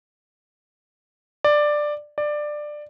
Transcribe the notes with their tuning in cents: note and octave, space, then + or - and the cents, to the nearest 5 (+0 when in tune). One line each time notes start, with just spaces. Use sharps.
D5 +10
D5 +15